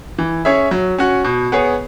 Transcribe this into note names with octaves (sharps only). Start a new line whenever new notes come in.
E3
C#4 G#4 C#5 E5
F#3
C#4 F#4
B2
B3 G#4 C#5